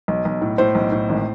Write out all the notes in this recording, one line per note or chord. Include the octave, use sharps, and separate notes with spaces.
B1
B1
A2
A2 C5
B1
A2
G#1